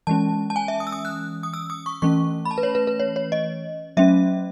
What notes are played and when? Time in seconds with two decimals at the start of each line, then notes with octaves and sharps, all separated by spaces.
0.07 E3 G#3 C#4 A5
0.50 A5
0.56 G#5
0.68 E5
0.80 D#6
0.87 E6
0.92 D#6
1.05 F#6
1.43 D#6
1.54 E6
1.70 D#6
1.86 C#6
2.02 E3 A3 C#4 C#6
2.45 B5
2.51 A5
2.58 B4
2.63 C#5
2.75 B4
2.87 B4
3.00 C#5
3.16 C#5
3.32 D#5
3.97 F#3 A3 C#4 E5